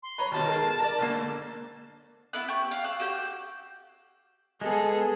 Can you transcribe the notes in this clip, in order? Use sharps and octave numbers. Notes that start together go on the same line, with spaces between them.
C6
B4 C#5 A#5
D#2 B2 D#3 A5
G#3 A#4
A#4 D5
F#1 D3 A#3
B3 E4 B4 F#6
G4 C#6
F5
F5 E6 F#6
F#4 G4 G6
G#3 B3 G#4 A4